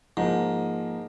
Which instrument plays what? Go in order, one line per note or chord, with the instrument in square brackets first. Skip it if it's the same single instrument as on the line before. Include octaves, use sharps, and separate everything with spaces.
[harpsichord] G#2 [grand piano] F3 A#3